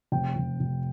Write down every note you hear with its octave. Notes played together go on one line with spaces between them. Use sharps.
F1 G5
F1
F1